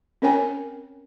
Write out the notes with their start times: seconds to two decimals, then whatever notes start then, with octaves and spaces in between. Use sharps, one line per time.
0.22 C4 C#4 A#4 C#5 G5 G#5